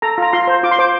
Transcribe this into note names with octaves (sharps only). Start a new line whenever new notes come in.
A4 A#5
F4 A#5
F4 C6
C5
F4 D6
C6
C5 D6